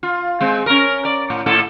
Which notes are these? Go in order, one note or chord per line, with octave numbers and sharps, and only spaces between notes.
F4
G#3 C4
C#4 A#4
D5
A2
A2 E4 A4